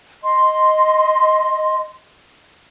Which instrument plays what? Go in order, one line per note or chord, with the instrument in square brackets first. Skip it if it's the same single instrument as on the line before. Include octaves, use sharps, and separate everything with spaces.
[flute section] D#5 C6